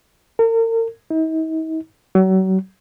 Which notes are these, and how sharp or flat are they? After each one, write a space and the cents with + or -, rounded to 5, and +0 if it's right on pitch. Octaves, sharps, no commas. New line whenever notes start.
A#4 -40
D#4 +45
F#3 +35